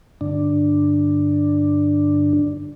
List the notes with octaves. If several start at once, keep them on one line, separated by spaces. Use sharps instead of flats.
G2 D3 D4